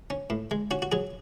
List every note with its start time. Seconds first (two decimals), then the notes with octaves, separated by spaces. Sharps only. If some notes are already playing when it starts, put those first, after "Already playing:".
0.10 C#4
0.30 A2
0.51 G#3
0.71 C#4 F#4
0.82 F#4
0.92 F#3 G#4